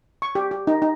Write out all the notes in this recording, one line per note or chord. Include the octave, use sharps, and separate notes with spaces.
C#6
G4
G4
D#4
D#4